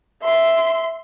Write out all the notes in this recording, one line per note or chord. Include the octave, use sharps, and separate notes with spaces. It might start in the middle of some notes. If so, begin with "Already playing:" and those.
E5 C6